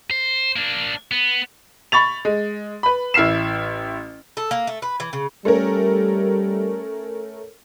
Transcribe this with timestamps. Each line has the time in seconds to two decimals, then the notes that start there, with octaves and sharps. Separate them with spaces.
0.11 C5
0.56 A#3 D4
1.11 B3
1.92 B5 C#6 A6 F7
2.25 G#3
2.83 B4 B5
3.14 A1 E4 F6 C7 E7
4.37 A4
4.51 A#3
4.67 A3
4.82 B4
5.00 E3
5.13 C#3
5.45 G3 A3 C#4 A#4